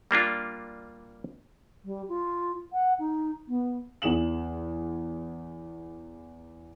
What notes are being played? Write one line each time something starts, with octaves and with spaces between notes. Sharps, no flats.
G3 A#3 D4 F4
G3
F4
F#5
D#4
B3
E2 G#4 E7 F#7